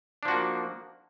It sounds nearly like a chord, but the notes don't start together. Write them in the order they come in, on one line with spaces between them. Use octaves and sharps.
D4 F3 F#4 A#3